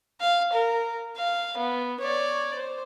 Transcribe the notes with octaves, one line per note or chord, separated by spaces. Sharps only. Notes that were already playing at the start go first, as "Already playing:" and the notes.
F5
A#4
F5
B3
C#5 D5
C5